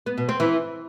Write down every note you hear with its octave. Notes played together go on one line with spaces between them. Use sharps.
B3
B2
C4
E3